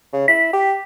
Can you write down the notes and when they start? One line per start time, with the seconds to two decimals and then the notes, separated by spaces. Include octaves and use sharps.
0.13 C#3
0.28 E4 B6
0.53 G4